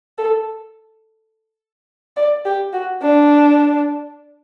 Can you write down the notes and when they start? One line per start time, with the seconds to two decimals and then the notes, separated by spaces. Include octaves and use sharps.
0.18 A4
2.17 D5
2.45 G4
2.73 F#4
3.02 D4